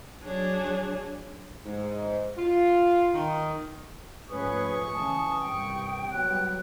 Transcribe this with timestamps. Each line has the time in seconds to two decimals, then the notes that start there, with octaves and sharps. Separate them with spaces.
0.23 F#3 D4 G#4 C#5
1.65 G#2
2.37 F4
3.14 D#3
4.29 G#2 F3 A3 C#4 G#4 B4 C#6 D#6
4.92 C#3 E3 G#5 A5
5.40 C2 G2 G5
6.11 F#3 G3 B3 F#6